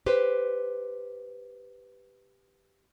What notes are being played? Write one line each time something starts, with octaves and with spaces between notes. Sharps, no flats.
G4 B4 C5